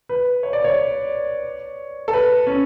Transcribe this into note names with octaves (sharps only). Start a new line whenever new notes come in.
B4
C#5
D5
C#5
A4
B4
C#4